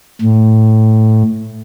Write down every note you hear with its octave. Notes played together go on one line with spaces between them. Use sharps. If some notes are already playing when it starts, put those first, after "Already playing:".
A2